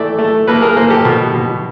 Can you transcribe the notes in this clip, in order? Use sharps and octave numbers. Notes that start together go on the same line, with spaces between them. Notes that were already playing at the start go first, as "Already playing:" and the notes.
Already playing: E3 A3 D5 E5
A3
A#3 A4 B4
G#4 A#4
A#3 A#4 C5
G4 A4
B2
B2